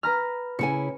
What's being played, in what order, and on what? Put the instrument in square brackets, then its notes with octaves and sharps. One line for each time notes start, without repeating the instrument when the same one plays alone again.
[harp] B4 A#5 F6
[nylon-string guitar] C#3 E4 G#5 [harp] C#7